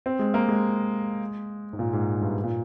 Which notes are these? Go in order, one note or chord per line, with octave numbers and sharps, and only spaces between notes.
C4
G#3
A#3
G#3
G#2
A#2
G#2
G2
A#2